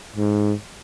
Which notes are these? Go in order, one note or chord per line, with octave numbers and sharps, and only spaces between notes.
G#2